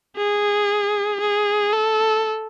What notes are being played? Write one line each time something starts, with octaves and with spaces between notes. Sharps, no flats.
G#4
G#4
A4